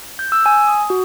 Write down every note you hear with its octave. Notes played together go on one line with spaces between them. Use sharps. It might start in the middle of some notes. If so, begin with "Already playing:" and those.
G6
E6
G#5
D#6
F#4